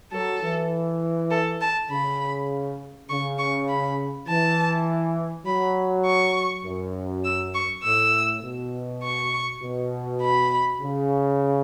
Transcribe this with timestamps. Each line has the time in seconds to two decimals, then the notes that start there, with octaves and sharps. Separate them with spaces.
0.12 F#3 A4
0.42 E3
1.31 A4
1.61 A5
1.90 C#3 B5
3.09 C#3 C#6
3.39 C#6
3.69 B5
4.28 E3 A5
5.46 F#3 B5
6.06 C#6
6.65 F#2
7.24 E6
7.55 C#6
7.84 A2 E6
8.43 B2
9.03 C#6
9.62 B2
10.22 B5
10.81 C#3